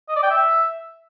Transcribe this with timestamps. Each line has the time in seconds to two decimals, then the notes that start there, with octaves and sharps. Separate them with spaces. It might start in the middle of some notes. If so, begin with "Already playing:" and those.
0.09 D#5
0.16 D5
0.23 G5
0.30 E5